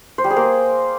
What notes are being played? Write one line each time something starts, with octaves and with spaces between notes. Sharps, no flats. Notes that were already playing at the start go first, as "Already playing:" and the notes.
C5
G3
G#4
A#3